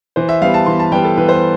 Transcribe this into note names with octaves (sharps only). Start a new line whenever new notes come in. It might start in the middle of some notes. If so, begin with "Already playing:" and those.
E3 C5
E5
G3 B3 F5
A5
E3 C6
A5
G3 B3 G5
A4
E3 B4
C5
B4